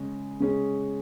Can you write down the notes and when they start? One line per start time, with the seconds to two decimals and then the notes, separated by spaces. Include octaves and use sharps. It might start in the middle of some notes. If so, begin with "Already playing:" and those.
Already playing: C#3 G#3 C#4 G#4
0.40 C#3 G#3 C#4 G#4